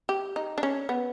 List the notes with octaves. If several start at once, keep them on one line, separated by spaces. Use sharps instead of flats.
G4
D#4
D4
C#4
B3